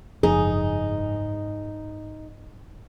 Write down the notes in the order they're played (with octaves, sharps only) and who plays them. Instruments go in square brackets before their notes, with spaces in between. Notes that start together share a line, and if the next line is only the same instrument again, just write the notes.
[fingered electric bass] F#1 F3 [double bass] G#2 [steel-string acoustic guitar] D#4 [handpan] G#4